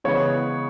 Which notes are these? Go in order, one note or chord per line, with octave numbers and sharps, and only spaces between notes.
C#3 E3 G#3 B3 C#5